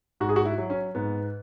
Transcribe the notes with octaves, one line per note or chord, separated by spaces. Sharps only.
G#2 F#4
G#4
F#4
E4
F#3
C#4
G#2 B3